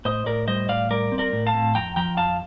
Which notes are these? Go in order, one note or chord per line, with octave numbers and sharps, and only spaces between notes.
A2 C5 D#5
A2 A#4 D5
G3 C5 D#5
A2 D5 F5
G3 A#4 D5
C4
A#4 D5
A2
F5 A5
C4
F2 G5 A#5
F3 G5 A#5
F2 F5 A5